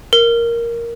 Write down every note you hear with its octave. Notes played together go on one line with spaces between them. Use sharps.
A#4